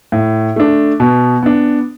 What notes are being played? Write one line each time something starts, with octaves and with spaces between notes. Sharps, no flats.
A2
A3 D4
B2
B3 D4